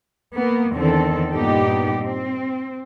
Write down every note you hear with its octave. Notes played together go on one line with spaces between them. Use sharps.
A#3 B3
E2 D3 D#3 C4 A4
G2 A#2 B3 D#4 G4
C4